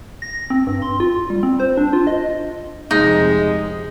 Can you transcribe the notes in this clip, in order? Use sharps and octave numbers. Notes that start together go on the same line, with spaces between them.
A#6
C4
G2
C6
F4
G3
C4
C5
D4
F4
D#5
F1 C3 G#3 D#4